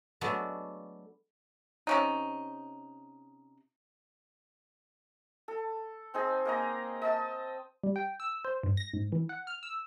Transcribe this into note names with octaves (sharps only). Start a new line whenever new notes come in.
F#3 G#3 A3 B3 D4 F#4
C3 C#4 D#4
A4
C4 D#4 G#4
A#3 D#5 A#5
D#5 A5 E6
G3
G5
E6
C5
G2
A#6
G#2
E3
F#5
F6
E6